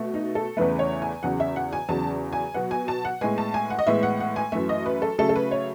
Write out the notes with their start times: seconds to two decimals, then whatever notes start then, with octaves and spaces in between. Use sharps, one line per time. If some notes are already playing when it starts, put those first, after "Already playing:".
Already playing: B2 A3
0.14 D#4
0.35 A4
0.57 E2 C#3 E3 A3 B4
0.79 C#5
1.02 G#5
1.23 E2 C#3 F#3 F#5
1.40 E5
1.56 F#5
1.73 G#5
1.89 E2 C#3 F#3 A5
2.33 G#5
2.54 B2 F#3 B3 F#5
2.71 G#5
2.88 A5
3.05 F#5
3.21 A2 G#3 B3 G#5
3.38 A5
3.54 G#5
3.70 F#5
3.79 D#5
3.87 A2 E3 G#3 B3 E5
4.03 F#5
4.20 F#5
4.36 G#5
4.52 F#2 E3 A3 E5
4.69 D#5
4.86 B4
5.02 A4
5.19 C#3 F#3 A3 A4
5.29 A4
5.36 B4
5.51 C#5